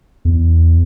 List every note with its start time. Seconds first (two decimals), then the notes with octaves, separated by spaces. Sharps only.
0.25 E2